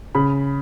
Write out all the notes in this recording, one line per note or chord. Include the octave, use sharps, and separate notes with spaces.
C#3 B5